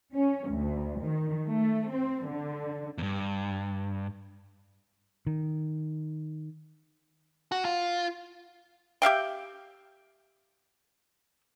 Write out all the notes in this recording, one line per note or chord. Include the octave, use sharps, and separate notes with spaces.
C#4
D2
D#3
A3
C4
D3
E2 G2
D#3
F#4
F4
G4 E5 F5 G5